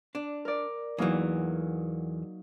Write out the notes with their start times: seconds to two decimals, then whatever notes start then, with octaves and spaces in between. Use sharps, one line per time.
0.15 D4
0.45 A#4 D5
0.98 E2 E3 F#3 A#3 D#4